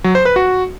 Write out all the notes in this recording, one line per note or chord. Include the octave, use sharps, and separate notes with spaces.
F#3
C5
B4
F#4